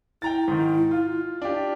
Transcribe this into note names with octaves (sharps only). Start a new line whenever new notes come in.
E4 G5 A#5 A6
G#2 D#3
F4
D4 F4 G4